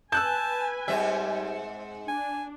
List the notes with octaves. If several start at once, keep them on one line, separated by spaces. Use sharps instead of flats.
B4 G#5 A5 E6 F#6 G6
G#2 G3 C4 E5
D4 G#5